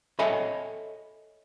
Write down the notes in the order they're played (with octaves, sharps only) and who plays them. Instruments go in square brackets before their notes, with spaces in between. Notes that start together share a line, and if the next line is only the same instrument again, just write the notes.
[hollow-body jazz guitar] A4 C#5 D#5 E5 G#5 B5